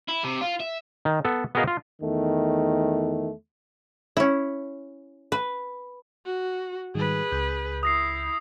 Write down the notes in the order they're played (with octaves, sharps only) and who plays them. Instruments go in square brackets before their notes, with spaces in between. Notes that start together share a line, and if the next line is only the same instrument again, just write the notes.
[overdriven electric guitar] E4
C3
F4
E5
[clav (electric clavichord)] D#3
B3 A4
B3 F#4 G#4 A#4 D#5 F5
F4
[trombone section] E2 D#3 A3
[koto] C#4 E4
B4
[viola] F#4
[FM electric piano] G#2 D#3 G3 [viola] G#4 B4
[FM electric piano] C#2 G6
[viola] E4 [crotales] D#6 A#6 C7